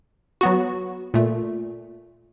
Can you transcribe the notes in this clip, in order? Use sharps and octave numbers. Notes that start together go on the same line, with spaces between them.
F#3 B3 F#4
A#2 A3